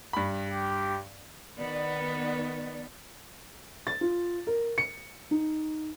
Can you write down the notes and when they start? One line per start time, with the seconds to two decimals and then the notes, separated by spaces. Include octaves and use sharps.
0.13 G2 B5
0.48 G4
1.58 D#3 B3 D5
3.87 A6
4.01 F4
4.47 A#4
4.78 C#7
5.31 D#4